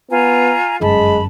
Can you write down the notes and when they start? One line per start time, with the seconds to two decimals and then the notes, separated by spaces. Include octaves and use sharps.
0.10 B3 F4 G#5 A#5
0.81 G1 F#2 G#3 A5 B5